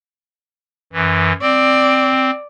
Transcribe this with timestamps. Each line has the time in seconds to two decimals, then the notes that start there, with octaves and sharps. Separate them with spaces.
0.93 F#2 E3
1.41 C4 D5